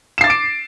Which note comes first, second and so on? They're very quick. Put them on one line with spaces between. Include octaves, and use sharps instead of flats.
E7 C7 A6 D6 D7